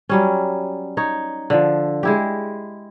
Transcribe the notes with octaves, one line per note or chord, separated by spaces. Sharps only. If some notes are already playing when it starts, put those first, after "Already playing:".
F#3 G3 C#4
D#4 C#5
D3 F3
G#3 E4 G4